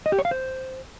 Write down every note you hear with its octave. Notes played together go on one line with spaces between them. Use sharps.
D#5
G4
C#5
F5
C5